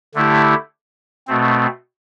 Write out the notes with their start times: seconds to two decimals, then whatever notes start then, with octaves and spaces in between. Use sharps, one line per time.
0.15 D3 A3 E4 G4
1.28 B2 A3 C4